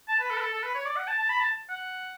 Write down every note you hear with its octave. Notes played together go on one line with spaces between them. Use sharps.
A5
B4
A4
B4
A4
A4
B4
C#5
D5
F#5
A5
A5
B5
A5
F#5